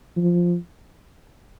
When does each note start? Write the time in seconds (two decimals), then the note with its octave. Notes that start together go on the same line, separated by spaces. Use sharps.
0.16 F3